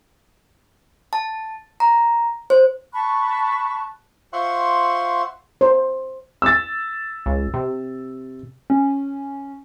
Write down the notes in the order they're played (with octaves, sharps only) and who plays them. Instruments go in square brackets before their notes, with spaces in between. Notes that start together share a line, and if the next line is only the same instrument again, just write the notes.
[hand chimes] A5
A#5
C5
[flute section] A5 B5 C#6 F#6
[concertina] F4 C5 E5 F#5 C6 C#6
[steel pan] C5
[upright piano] E6 A6
[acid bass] C#2
C3
[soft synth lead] C#4